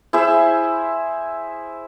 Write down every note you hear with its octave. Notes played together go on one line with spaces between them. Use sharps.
E4 G#4 C5 E5